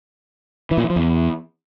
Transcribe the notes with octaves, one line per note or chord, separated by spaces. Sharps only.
E3
A#2
E3
F3
E2